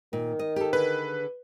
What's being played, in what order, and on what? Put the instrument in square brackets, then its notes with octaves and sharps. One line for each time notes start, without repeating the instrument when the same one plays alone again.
[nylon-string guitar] A#2 [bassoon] D#3
[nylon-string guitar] D#5
G4 A4
[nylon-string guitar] D3 G#4 [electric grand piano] B4